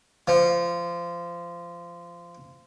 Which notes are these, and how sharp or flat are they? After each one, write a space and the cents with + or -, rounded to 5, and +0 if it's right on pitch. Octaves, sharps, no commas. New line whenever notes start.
F3 -20